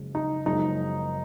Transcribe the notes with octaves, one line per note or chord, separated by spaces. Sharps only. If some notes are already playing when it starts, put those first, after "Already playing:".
Already playing: F#1 F#2 C#3 F3 G#3
D#4
F#1 F#2 F3 G#3 D#4